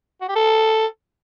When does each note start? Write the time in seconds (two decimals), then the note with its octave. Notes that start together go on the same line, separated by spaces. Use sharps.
0.21 F#4
0.28 G4
0.36 A4